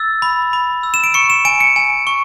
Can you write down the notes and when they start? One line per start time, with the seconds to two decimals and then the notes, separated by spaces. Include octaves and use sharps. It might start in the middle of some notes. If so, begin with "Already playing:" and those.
Already playing: E6 A6
0.22 B5
0.53 B5
0.83 E6
0.94 E7
1.04 D7
1.14 C#6 C#7
1.30 E7
1.45 G#5 D7
1.60 C#7
1.76 G#5
2.07 C#6